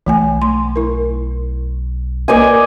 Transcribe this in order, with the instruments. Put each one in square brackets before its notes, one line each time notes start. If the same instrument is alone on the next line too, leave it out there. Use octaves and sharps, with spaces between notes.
[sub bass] B1 [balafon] E3 A3 G#5
[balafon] A3 C6
E4 A#4
[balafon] A#3 A#4 B4 [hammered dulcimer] D5 D#5 G#5